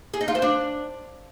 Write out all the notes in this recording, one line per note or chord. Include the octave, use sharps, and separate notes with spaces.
G#4
D#4
F4
C5
D4